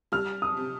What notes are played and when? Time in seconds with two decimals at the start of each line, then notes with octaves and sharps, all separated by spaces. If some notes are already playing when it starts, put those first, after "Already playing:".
0.12 G3 F6
0.42 D#6
0.57 C3